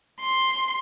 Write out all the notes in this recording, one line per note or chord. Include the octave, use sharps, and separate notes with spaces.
C6